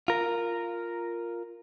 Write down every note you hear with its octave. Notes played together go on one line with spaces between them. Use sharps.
F4 A#4